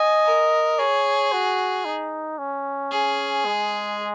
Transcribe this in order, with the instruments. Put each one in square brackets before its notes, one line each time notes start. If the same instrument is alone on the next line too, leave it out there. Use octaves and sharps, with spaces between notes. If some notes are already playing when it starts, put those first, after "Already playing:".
Already playing: [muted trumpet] D#5 [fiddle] G#5
[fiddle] A#4
[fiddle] G#4 [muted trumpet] C#5
[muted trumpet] F#4
D#4
C#4
[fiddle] G#4
[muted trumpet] G#3